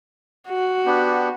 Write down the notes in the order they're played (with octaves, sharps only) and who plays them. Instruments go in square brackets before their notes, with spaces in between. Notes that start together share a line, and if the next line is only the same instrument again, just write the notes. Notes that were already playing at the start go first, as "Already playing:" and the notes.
[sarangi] F#4
[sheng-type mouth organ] B3 D4 G4